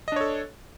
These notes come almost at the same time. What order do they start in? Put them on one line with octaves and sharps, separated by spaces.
D#5 D4 C#5 A4